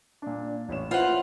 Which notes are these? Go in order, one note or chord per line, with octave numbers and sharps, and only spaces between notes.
A#2 D4
A1 C#4 E7
E4 F4 B4 C5 F#5